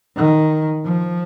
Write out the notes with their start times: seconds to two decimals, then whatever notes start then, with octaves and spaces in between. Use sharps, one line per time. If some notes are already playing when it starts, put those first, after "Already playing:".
0.17 D#3
0.85 F3